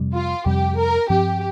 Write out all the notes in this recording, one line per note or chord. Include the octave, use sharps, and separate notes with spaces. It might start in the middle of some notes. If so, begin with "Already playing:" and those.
Already playing: F2 C3 G3
F4
F2 C3 G3 G4
A#4
G2 F3 C4 G4